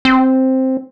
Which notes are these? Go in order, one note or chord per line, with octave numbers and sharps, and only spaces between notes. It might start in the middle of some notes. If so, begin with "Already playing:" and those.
C4